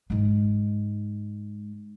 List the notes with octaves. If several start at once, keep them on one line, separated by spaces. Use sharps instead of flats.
G#2 G#3